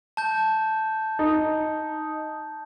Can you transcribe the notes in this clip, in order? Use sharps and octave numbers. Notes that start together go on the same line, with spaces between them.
A5 G6
D#4